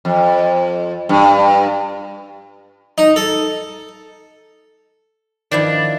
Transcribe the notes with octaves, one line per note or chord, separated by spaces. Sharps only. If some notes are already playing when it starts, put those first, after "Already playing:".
F2
G2
D#4
A4
D#3 F3 D4 E4